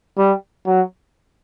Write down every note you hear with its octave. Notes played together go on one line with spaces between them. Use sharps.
G3
F#3